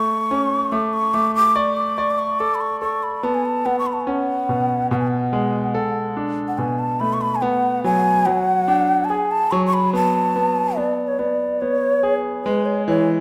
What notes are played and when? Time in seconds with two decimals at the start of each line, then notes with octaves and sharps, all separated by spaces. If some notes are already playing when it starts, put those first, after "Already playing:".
Already playing: A3 C#6
0.31 C#4
0.72 A3 D6
0.93 C#6
1.14 A3 D6
1.35 D6
1.56 D5 C#6
1.77 D6
1.97 D5 C#6
2.11 D6
2.19 C#6
2.39 A4 D6
2.55 B5
2.61 C#6
2.81 A4 C#6
3.03 B5
3.23 B3 A5
3.34 G#5
3.45 A5
3.66 B3 F#5
3.79 C#6
3.86 B5
3.93 A5
4.01 G#5
4.07 C#4 F#5
4.49 B2
4.91 B2 F#5
4.99 G#5
5.07 F#5
5.33 G#3
5.75 A4
6.17 D4
6.48 F#5
6.58 B2 G#5
6.79 A5
7.00 A3 B5
7.13 C#6
7.21 B5
7.35 G#5
7.42 B3 F#5
7.84 F#3 G#5
8.26 F#3 F#5
8.68 D4
9.05 A5
9.10 G#4 G#5
9.31 A5
9.51 F#3 C#6
9.67 C#6
9.73 B5
9.93 B3 A5
10.36 B3
10.77 B3 D5
11.08 C#5
11.19 B3 D5
11.61 B3 C#5
12.03 G#4
12.45 G#3 B4
12.66 C#5
12.87 E3 C#5